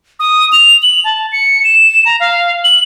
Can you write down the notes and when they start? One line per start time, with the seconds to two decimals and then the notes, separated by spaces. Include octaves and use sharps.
0.19 D#6
0.52 F7
0.82 F#7
1.04 A5
1.32 C#7
1.64 E7
2.05 A#5
2.20 F5
2.64 F#7